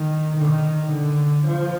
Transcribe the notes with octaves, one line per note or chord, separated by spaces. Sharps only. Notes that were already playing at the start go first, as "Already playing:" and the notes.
Already playing: D#3
D#3
D3
F3